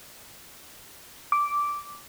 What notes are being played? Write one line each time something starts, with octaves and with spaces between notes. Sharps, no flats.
D6